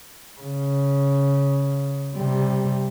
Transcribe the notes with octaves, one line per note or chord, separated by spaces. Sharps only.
C#3
C3 G3